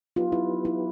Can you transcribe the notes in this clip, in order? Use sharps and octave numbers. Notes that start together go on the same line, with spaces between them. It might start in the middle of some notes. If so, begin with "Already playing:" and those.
F#3 B3 D#4 F4 G4 B4
E4
E4